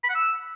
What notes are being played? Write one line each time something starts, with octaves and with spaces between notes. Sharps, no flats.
B5
F#5
E6